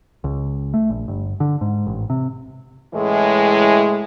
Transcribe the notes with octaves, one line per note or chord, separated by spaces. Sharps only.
C#2
A3
A#1
G1
D3
G#2
A1
C3
A2 C#3 E3 G#3